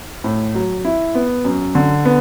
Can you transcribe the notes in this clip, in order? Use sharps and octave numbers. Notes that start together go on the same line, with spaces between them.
A2
F#3
E4
B3
F#2
D3
B3